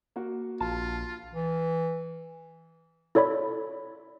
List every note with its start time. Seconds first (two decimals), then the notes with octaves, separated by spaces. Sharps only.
0.16 A#3 F#4
0.60 A#1 F4 A5
1.33 E3
3.15 E4 A4 C#5 D5 B5